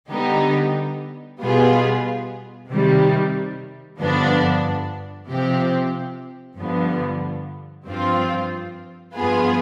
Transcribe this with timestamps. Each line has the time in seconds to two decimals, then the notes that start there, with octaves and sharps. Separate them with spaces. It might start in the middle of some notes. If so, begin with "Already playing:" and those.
0.10 D3 G3 B3 D#4 G4
1.40 B2 G3 B3 F4 G#4
2.68 C3 D#3 G3
3.98 G2 D3 F3 B3 D4
5.27 C3 F3 C4 G4
6.57 G2 D3 F3 B3
7.86 G2 F3 C4 F4
9.15 G2 F3 B3 F4 G#4